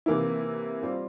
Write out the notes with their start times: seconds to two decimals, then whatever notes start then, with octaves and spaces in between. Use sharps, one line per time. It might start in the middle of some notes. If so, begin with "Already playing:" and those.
0.06 C3 E3 A#3 E4
0.83 G3 C4 F4 C5